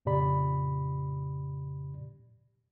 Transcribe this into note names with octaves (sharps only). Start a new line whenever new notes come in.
F2 A#2 C#3 G4 D5 B5